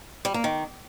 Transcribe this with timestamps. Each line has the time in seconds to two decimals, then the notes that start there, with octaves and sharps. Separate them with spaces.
0.25 G3
0.34 A#3
0.44 D#3